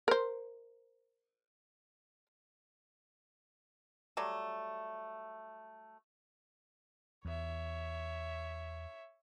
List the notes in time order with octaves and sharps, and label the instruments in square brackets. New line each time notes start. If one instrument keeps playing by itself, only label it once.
[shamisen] A#4 C5
[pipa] F#3 G3 A3
[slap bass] E2 [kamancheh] C#5 E5